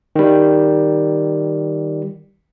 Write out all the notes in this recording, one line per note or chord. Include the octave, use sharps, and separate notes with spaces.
D#3 G3